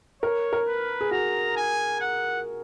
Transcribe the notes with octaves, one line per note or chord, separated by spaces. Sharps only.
A#4 C#5
A#4
B4
G#4
F#4 A#5
G#5
F#5